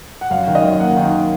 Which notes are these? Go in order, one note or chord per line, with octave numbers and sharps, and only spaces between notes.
F#5
F#2 F5
D#3
D#5
F#2
A#3 F#5
D#3